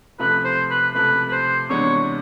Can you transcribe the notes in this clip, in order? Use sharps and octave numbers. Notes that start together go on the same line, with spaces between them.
C3 F3 A3 B4
C5
B4
C3 F3 A3 B4
B4
C5
C3 E3 G#3 B3 D4 C#5